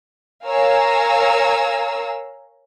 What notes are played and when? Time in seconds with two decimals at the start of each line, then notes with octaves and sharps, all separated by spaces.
0.47 A#4 C#5 F5 G#5 A#5 E6